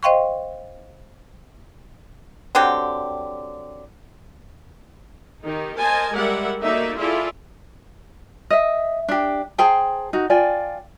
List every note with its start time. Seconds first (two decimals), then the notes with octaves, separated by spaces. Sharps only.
0.03 C5 D#5 F5 G5 C6 C#6
2.55 D3 F#3 C4 G4
5.43 D#3 D#4 G4
5.78 A#4 C5 D#5 G#5 A5
6.15 G3 G#3 A#4 D5 E5 F#5
6.61 A3 A#3 D#4 F#4 D5 E5
6.97 E4 F4 G#4 A4 D5 E5
8.50 D#5 E5
9.08 D4 G4
9.58 G#4 C5 G5 A5
10.13 D#4 F#4
10.30 F4 D5 G5 G#5